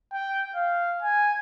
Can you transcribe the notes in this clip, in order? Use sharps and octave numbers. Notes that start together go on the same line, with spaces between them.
G5
F5
G#5